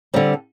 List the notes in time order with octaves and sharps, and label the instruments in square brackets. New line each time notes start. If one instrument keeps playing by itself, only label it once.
[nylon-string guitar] D3 G3 C4